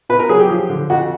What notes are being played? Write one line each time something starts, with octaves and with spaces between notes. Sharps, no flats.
B2 B4
A#4
F#3 G#4
G4
F3
D3
F2 F#4